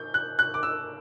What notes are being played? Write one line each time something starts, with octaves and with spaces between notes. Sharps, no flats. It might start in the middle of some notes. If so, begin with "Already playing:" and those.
Already playing: G6
F#6
F#6
D6
E6